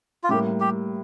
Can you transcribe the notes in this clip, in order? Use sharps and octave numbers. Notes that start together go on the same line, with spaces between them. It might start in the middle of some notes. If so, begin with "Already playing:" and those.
F4
A2 G3 A#3 G4
G4